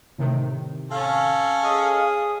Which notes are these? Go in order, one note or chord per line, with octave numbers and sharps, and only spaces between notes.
A2 C3 D#3
C#4 A4 F5
G#4 D#5 D#6